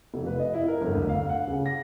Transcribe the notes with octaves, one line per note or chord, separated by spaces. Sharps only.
F1
B4
D#5
E4
A#4
G1
D2
F5
F#5
C#3
A#6